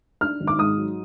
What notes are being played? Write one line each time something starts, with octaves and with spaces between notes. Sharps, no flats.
D4 F6
G#1
D6
G#2 D#6
F#3